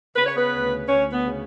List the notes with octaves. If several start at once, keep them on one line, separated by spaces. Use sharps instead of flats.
C#3 B4
C#5
B3 B4
D2
D2 C#4 C#5
B3 B4
C#3